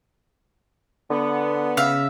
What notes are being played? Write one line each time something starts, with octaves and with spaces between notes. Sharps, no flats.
D3 B3
C#3 E5 F5